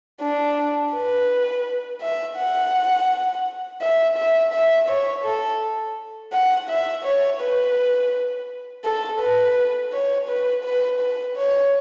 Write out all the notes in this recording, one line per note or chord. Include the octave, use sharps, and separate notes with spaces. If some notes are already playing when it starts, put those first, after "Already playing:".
D4
B4
E5
F#5
E5
E5
E5
C#5
A4
F#5
E5
C#5
B4
A4
B4
C#5
B4
B4
B4
C#5